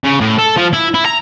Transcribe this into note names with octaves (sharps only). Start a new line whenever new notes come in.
C#3
A2
A4
F3
E4
E4
A#5